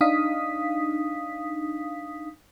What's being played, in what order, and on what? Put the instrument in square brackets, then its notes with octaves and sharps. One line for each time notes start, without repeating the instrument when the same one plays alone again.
[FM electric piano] D4 D#4 F5 D#6 B6